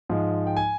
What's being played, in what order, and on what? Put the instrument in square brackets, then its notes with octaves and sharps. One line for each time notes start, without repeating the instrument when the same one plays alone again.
[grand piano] G#2 F3 G#3
G5
G#5